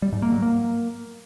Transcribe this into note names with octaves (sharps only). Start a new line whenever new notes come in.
G3
G#2
A#3
F#3
A#3